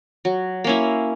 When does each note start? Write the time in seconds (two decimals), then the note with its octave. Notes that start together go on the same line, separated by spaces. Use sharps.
0.25 F#3
0.64 A#3 C#4 E4